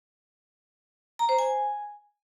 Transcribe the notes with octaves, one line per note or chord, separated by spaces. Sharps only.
A#5
C5
G#5